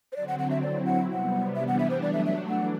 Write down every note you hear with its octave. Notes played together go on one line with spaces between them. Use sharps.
C5
D3 F#3 C4 D5
F#5
F#5
E5
F#3 C4 E4 D5
F#5
C3 G3 B3 F#5
E3 G3 B3 D4 E5
F#5
E5
C5
F#3 A3 D4 D5
E5
E5
E3 D4 F#5